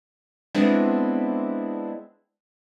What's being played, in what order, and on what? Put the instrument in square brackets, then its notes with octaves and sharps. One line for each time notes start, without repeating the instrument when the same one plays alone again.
[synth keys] G#3 B3 C4 D4 E4